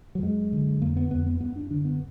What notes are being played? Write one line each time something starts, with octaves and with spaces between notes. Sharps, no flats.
F#3
F#2 G#3
D3
F2 A#3
B3
F2 B3
B3
F#2 B3
D4
D3 D4
B3